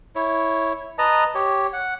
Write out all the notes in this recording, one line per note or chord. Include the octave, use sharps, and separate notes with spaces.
E4 C#5
B4 D#5 A5 A#5
G4 C#5
F#5